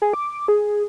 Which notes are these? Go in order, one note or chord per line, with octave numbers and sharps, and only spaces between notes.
G#4
D6
G#4